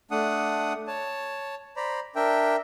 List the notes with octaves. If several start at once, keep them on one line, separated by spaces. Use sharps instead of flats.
A3 D4 F#5 D#6
C#5 A5
C5 D5 A#5 B5
D4 A#4 E5 G5